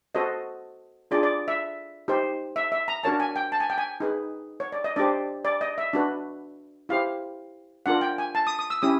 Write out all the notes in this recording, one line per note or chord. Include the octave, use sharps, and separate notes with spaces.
F#4 A4 C5 D#5
D4 F4 G#4 D5
D5
E5
D#4 G4 C5
E5
E5
A#5
D4 F#4 A#4 C#5 A5
G#5
G5
A5
G#5
G5
G#5
D#4 G#4 B4
C#5
D5
D#5
D4 G4 C5 D5
D5
D#5
E5
D4 F#4 B4
E4 G4 C5 F5
D4 F4 A#4 F#5
G5
G#5
A5
D#6
D#6
E6
C#4 E4 G4 D#6